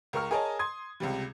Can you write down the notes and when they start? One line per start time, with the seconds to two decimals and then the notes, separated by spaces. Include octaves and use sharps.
0.13 C#2 A#4 C#6 F6
0.31 G#4 A#4 C#5 D#5 G#5 A5
0.59 C6 D#6 G#6
1.00 C#2 C3 G3